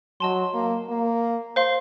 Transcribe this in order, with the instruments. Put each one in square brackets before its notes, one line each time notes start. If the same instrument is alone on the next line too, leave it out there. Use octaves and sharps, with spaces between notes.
[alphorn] F#3 [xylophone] D#5 A5 C6
[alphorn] A#3
A#3
[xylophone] C5 F5 C6